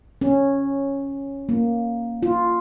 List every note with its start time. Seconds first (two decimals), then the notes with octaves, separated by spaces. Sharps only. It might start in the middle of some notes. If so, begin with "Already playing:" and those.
0.22 C#4
1.49 A#3
2.23 F4